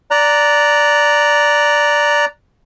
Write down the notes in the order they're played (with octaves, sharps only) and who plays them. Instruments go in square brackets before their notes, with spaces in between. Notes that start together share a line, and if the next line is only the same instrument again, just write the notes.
[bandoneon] D5 A#5 F#6